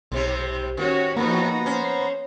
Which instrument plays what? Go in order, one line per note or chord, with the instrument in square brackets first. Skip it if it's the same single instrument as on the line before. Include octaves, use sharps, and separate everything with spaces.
[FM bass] B1 [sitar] G#2 C3 G3
[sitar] D#3 [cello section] C#4 F#4 C#5
[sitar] E2 A2 [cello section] F3 D#4 F#4 [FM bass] A#3 [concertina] B3 A#5
[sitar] C#4 [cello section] C5